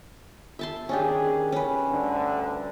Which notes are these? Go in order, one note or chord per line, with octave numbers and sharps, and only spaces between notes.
E5 A5 C6
D#3 C#4 D4 G4 G#4
C#4 B4
D2 G2 D3